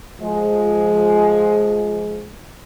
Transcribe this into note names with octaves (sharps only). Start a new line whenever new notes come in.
F3 G#3